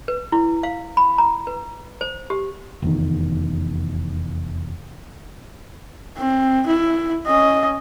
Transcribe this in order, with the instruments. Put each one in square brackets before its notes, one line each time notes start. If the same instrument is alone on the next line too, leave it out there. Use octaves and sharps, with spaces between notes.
[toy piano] B4
E4
F5
B5
A#5
B4
C5
G4
[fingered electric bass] F1 E2 D#3
[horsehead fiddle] C4
E4
C#4 D#5